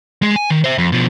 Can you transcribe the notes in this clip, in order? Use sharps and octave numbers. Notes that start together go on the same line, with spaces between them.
G#3 G#4
G#5
D#3
C5 E5
F2
B2 F3